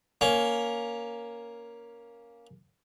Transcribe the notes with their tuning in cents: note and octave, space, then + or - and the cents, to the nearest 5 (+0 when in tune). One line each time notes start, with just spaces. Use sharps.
A#3 +5 C#4 +10